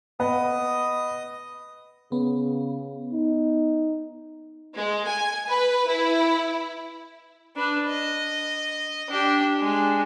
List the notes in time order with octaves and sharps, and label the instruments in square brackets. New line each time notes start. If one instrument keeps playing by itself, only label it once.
[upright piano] B3 [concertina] D#5 D#6
[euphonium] C#3 [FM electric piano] B3
[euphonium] D#4
[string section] G#3
G#5
B4
E4
[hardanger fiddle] D4 B4
D#5
D4 G4
G#3 D4